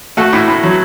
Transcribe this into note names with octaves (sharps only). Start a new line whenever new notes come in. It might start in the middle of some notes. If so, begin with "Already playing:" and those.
A3 F#4 A4
A2
A2
F#3